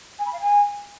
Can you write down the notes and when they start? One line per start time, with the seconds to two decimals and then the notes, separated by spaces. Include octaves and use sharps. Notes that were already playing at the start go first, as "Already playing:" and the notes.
0.18 G#5
0.25 B5
0.32 F5
0.39 G#5